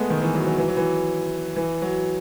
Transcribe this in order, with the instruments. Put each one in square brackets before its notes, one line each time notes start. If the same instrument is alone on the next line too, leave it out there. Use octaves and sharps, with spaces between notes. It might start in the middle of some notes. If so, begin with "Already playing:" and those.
Already playing: [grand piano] G#3 A3 B3
D#3
E3
F#3
F#3
E3
F#3
E3
E3
F#3